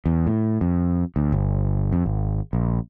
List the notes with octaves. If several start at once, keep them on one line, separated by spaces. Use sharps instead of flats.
E2
A2
F2
D2
G1
F2
G#1
A#1